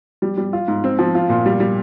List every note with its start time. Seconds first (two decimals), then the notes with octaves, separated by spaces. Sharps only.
0.22 G3
0.37 G3
0.53 F4
0.68 G#2
0.84 C4
0.99 F3
1.15 F4
1.29 A#2
1.46 G3
1.60 G3